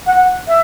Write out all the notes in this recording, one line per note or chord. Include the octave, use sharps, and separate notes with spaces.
F#5
E5